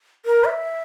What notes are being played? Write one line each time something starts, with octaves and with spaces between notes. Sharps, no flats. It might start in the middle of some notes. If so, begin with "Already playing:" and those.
A#4
E5